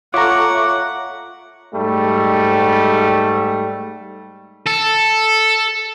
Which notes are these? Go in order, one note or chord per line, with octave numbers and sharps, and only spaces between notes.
F4 A4 C#5 E5 F#5 A#5 C#6 D6
G#2 G3 A3
A4